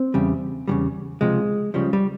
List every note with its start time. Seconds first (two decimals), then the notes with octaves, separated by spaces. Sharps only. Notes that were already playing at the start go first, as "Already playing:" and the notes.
Already playing: C4
0.14 E2 C#3 G3
0.68 E2 C#3 E3 G3
1.21 C#2 C3 F3 G#3
1.74 C#2 C#3 F3 G3
1.93 G3